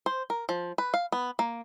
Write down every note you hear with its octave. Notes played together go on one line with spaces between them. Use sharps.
C5
A#4
F3
B4
F5
B3
A#3